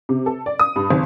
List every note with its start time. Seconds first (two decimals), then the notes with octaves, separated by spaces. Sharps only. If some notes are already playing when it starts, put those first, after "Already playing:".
0.09 C3
0.26 A4
0.46 D5
0.60 D#6
0.76 G2
0.90 G#1